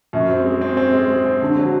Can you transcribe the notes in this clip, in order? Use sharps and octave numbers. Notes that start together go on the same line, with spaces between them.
F#2
C4
G#3
C4
C4
G#3
G#3
C4
D3
F#3